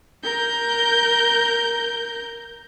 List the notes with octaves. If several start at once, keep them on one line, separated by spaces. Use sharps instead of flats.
A#4 G6